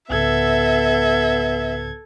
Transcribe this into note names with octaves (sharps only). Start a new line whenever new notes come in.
C2 G#2 C#3 B3 A4 E5 G#6